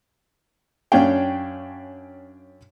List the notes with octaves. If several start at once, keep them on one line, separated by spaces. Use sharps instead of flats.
F#2 C#4 D4 C#5 F5 G5